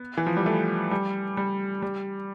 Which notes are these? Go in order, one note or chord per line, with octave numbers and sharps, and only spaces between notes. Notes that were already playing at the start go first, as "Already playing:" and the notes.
Already playing: B3
E3
F3
G3
A3
G3
G3
G3